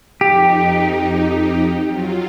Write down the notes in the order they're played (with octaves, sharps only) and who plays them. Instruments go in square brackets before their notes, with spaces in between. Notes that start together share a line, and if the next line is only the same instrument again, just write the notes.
[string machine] F2 D#4 [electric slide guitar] G4
[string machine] F#3 F4